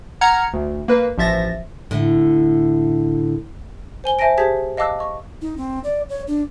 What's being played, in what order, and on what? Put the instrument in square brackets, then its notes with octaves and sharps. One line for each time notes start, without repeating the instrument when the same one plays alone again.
[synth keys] F#5 A#5 F6 G#6 C#7
D2
A#3 B4
A1 F3 E5 A6 A#6
[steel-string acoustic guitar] A2 D3
[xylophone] C5 G#5 G7
C5 E5 G#5 A5 A#6 D7
G4 G#4 C5 A5 G#6 B6
D#5 F5 A5 D6 E6 F#6
D#5 C#6
[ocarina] D#4
C4
D5
C#5
D4